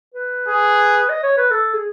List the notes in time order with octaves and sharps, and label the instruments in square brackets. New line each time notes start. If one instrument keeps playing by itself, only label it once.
[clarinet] B4
[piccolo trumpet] G#4
[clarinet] D#5
C#5
B4
A4
G#4